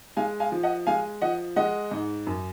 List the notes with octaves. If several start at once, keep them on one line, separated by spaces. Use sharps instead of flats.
G#3 F5 G#5
F5 G#5
F3
D#5 F#5
G#3 F5 G#5
F3 D#5 F#5
G#3 D#5 F#5
G#2
F#2